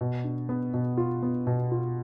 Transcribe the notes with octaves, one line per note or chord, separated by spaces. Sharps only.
B2
D4
B3
B2
F4
B3
B2
F4